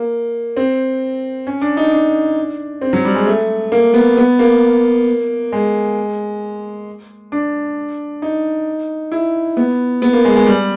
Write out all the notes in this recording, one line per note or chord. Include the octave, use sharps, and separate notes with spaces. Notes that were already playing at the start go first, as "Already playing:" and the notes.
Already playing: A#3
C4
C#4
D4
D#4
D4
C4
F#3
G3
G#3
A3
A#3
B3
B3
A#3
G#3
D4
D#4
E4
B3
B3
A#3
G#3
G#3
G3